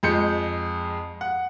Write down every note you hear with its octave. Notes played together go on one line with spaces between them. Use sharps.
F2 G#3 G6 C#7
F#5